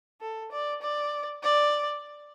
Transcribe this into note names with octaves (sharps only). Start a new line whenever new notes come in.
A4
D5
D5
D5